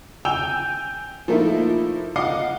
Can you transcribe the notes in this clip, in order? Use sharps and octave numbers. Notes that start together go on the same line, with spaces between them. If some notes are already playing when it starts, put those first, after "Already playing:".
G5 G#5 E6 G6 F7
F3 A3 A#3 D#4 E4
D#5 F5 F#5 D6 C7